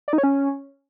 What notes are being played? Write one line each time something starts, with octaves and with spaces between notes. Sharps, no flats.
D5
D#4
C#5
C#4